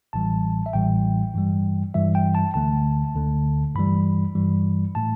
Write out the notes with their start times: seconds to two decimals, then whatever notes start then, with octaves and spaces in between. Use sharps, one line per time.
0.13 A1 A2 E3 G3 A5
0.66 E5
0.73 A1 A2 E3 G3 G5
1.34 G2 E3 G3
1.94 G2 E3 G3 E5
2.15 G5
2.35 A5
2.54 D2 D3 A3 A5
3.15 D2 D3 A3
3.75 G2 E3 G3 B5
4.35 G2 E3 G3
4.95 A2 A3 A5